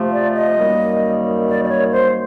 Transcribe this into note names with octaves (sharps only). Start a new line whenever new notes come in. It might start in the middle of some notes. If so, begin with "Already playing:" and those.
Already playing: C3 F3 A3
D5
D#5
F#2 D#3 G3 A#3
D5
D5
C#5
C5